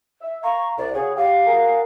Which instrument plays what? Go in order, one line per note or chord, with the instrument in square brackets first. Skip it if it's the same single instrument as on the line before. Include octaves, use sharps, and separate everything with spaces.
[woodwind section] E5
[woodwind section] F5 A#5 [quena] C#6
[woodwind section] C2 [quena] D5
[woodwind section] C#3 F#4 C#5 [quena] G#4
[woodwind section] G4 [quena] F5
[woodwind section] F#4 G#4 A#4